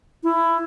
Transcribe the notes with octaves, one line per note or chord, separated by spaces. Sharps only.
E4